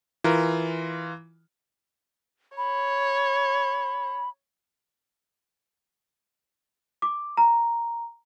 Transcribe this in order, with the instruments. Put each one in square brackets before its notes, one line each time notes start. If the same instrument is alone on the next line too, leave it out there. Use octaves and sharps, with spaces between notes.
[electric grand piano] E3 F4 A#4
[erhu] C#5 [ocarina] B5
[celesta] D6
A#5